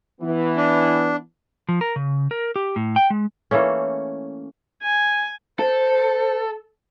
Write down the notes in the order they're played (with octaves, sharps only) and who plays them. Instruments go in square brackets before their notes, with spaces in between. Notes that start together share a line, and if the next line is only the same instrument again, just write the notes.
[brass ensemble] E3 B3
[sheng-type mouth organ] D4
[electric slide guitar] F3
A#4
C#3
A#4
G4
A2
G5
G#3
[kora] E3 A3 A#3 C#4
[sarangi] G#5
[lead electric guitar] A4 [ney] C5